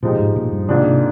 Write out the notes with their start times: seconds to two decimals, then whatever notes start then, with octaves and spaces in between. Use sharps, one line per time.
0.03 A#2 F3 G#3 D#4 G4
0.19 G#2
0.36 A#2
0.52 G2
0.68 G#2 C3 D#3 A#3 D4 F4
0.85 C3